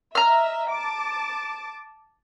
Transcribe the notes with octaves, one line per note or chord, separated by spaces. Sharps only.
D#5 E5 A#5 F6
A5 D6